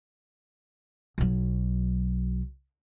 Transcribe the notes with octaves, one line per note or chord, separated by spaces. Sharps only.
B1 F#3